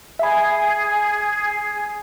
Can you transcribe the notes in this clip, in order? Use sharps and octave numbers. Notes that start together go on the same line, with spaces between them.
G#4 E5 B5